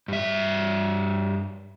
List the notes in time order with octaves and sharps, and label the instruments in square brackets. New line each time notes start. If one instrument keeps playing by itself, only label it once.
[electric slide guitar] G2 E5